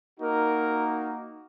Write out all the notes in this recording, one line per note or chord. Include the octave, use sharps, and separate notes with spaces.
A#3 D#4 F#4 A#4